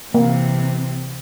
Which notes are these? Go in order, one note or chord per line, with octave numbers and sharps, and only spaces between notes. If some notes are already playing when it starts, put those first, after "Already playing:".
C3 E3 A#3